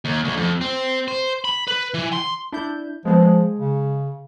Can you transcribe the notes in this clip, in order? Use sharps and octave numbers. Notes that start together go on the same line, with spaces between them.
D#2
D2
F2
C4
C5
B5
B4
E3
C6
D4 E4 G6
F3 G#3 B3 C4
G#3
C#3